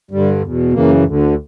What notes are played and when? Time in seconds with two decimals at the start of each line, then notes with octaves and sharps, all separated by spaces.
0.11 G2 D3 G3
0.41 E2
0.47 B2
0.73 F#2 C#3 E3 A#3
1.04 D2 D3